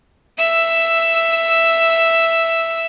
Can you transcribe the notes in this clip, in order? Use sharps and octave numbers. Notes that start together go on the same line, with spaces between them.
E5 E6